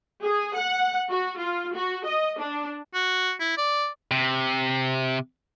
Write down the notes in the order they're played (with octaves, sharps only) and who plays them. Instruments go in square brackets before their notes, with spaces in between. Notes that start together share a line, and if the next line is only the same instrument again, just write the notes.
[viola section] G#4
F#5
F#4
F4
F#4
D#5
D4
[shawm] F#4
E4
D5
[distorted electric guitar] C3